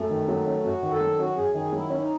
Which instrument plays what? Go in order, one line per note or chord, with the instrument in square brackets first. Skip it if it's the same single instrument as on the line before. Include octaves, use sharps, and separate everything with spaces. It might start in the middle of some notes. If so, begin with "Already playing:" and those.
Already playing: [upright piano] F#2 [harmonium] A3
[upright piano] D#3
F#3
C#4
[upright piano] F#2 [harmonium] F#4
[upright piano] D#3
[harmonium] A4
[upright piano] F#3
[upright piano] C#4 [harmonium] F#4
[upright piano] F#2 [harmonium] G#4
[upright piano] D#3 [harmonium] G#4
[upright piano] F#3 [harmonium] E4
[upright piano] C#4
[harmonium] D#4